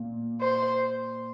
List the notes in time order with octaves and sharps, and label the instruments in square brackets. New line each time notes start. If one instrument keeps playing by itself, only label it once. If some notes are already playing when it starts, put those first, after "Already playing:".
Already playing: [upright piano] A#2 A#3
[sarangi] C5